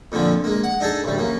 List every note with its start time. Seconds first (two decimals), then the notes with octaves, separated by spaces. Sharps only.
0.12 F2 A#2 D3 F3
0.44 G#3 A#3
0.64 F#5
0.80 D4 D#4 G#4 A4
1.04 A1 D2 G3
1.17 F#2 A#3